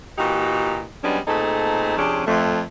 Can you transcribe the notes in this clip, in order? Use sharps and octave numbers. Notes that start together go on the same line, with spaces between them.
A#2 E3 D#4 F#4 G4
F#2 G3 G#3 B3 C#4 D4
A#2 A3 C4 D#4 G#4 A4
F2 C3 C#4 D4 G#4
F2 A3